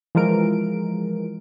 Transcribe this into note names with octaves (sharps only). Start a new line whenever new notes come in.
E3 F3 G#3 A#4 D7